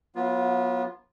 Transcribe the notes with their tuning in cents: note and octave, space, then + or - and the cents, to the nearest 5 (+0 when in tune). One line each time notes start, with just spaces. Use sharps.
F#3 -30 B3 -25 F4 +0